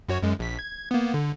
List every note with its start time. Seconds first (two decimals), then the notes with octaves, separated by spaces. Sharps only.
0.09 F#2 F#4 C#5
0.23 F#2 G#3
0.39 A#1 B6
0.59 G#6
0.91 A#3 B3
1.14 D3